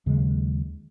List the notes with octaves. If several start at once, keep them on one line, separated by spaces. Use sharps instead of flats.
D#2 C#3 F#3 G#3